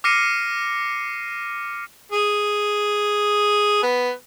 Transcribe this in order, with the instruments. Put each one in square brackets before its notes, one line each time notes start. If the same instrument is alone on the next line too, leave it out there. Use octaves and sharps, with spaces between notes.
[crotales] D6 F6 A#6 C7 C#7 D#7
[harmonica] G#4
B3